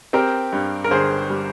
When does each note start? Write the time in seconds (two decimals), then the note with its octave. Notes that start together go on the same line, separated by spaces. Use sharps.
0.13 C4 G4 A#4
0.53 G2
0.84 A#4
0.91 G1 G#4 C5
1.30 G3